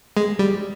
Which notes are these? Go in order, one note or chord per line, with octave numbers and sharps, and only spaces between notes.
G#3
G3